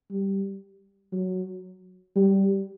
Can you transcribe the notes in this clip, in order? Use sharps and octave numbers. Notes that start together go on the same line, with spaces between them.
G3
F#3
G3